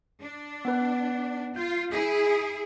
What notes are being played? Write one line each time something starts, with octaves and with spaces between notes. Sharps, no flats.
D4
B3 B4
F4 G6
E4 G#4